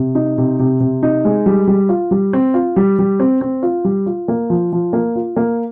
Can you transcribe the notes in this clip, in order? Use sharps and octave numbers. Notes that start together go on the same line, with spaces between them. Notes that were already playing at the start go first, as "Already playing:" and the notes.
Already playing: C3
D#4
C3
C3
C3
D#4
G#3
G3
G3
F4
G3
C4
F4
G3
G3
C4
C4
F4
G3
F4
A#3
F3
F3
A#3
F4
A#3